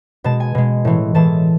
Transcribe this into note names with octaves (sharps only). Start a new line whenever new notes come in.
B2 G#3 A5
G#5
B2 G#3
A2 E3 G#3
A2 E3 G#3 A5